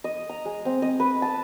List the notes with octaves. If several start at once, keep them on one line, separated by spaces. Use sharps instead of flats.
D#5
A#5
G#3
C4
D#5
B4
A5